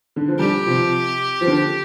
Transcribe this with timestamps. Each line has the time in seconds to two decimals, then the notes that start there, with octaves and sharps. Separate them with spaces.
0.16 D3
0.28 F3
0.39 D3 G3 G4
0.66 C3 F3
1.41 F3
1.47 D3